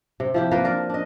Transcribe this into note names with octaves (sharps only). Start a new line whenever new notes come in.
C3
F3 E4 G4
A#3 F4 A#4 B4
D4 A#4 D5
D4 D#5